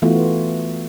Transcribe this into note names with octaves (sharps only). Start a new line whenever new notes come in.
E3 A3 B3 F4 F#4